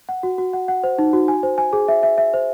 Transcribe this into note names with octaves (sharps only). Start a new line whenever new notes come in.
F#5
F#4
F#4
F#5
F#5
C5
D#4
F#4
G#5
C5
G#5
G#4
E5
E5
E5
C5